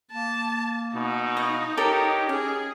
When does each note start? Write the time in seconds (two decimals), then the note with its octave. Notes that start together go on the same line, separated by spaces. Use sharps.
0.12 A#3 A5
0.95 B2 D#4
1.37 D#5 F5
1.77 G4 A4 A#4 C#5 D#5
2.29 C#4 G#4 G#5